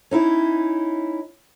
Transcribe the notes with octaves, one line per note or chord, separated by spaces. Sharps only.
C#4 D#4 E4